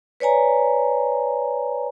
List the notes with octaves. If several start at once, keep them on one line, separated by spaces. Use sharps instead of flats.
B4 C#5 D5 G#5 A#5